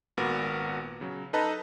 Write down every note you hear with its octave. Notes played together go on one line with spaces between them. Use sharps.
G#1 A#2 B3 F#4 A#4 A#6
C#3 F#3
D#4 A4 B4 D#5 A5 A#5